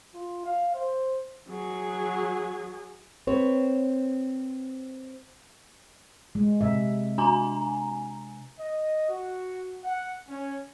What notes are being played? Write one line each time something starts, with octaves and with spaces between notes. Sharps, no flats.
F4
F5
C5
F#3 G#4
C4 B4 C#5
G#3
C3 E5
D4 G#5 A#5
D#5
F#4
F#5
C#4